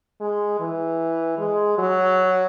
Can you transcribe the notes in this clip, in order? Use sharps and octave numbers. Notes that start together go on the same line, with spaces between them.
G#3
E3
G#3
F#3